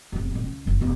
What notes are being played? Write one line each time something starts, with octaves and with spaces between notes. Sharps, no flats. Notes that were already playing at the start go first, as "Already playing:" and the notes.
F1 E2
A1 A2
C#2
F#1 G#2
E1